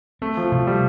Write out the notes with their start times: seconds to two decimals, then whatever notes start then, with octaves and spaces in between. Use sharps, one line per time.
0.22 A3 C4
0.37 F3
0.52 C3 F3
0.67 G3